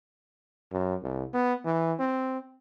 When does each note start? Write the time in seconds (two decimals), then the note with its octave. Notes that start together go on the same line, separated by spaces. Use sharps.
0.72 F#2
1.02 C2
1.34 B3
1.65 E3
2.00 C4